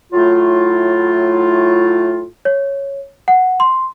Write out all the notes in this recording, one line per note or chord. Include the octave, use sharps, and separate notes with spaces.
A2 F#3 A3 E4 F4
C#5
F#5
C6